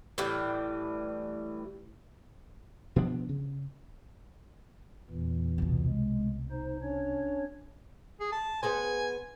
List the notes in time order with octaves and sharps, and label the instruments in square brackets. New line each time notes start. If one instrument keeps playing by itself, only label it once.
[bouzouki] A2 E3 G3
[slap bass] B2 F3 B3 D4
C#3
[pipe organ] E2 A#2 E3
[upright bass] C2 B2
[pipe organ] G#3
D#4 C5
C#4 D4 C#5
[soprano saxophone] G#4
A5
[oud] B3 G#4 C5 [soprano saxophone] G#5